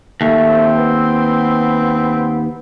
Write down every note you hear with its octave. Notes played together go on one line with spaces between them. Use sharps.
D#2 A3
C4
B3